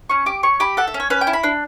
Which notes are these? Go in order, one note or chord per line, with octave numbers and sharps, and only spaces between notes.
C#4 C#6
G4 D6
C#4 C#6
G4 B5
A4 F#5
E5
C#4
C#5
C#4 B4
G5
E4
B5
D4